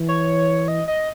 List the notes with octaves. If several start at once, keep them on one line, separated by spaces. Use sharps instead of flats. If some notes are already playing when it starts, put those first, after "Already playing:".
Already playing: E3
C#5
D#5
D#5